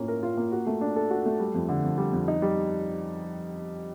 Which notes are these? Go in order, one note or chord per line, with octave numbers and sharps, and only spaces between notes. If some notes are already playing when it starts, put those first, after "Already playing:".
Already playing: A2 A#3 C#4 F4
A#4
F4
A#3
F#4
A3
D4
A4
F#4
A3
G3
F2
D3
F2
G3
F2
D#4
G3